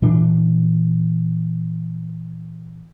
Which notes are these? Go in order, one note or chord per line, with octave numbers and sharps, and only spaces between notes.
A#2 E3 D4